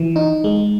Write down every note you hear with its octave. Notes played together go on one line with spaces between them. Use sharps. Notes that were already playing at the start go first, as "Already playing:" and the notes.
Already playing: E3
D#4
G#3